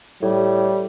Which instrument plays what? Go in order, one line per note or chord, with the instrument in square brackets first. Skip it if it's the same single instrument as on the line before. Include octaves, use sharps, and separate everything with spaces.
[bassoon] A2 [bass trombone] G3